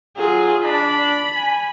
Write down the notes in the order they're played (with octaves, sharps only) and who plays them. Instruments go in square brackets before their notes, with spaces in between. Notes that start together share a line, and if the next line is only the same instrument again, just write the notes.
[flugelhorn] F#3 [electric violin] F4 G#4
[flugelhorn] D4 [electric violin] B5
[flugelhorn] G#5